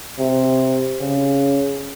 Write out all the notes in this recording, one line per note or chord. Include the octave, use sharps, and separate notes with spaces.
C3
C#3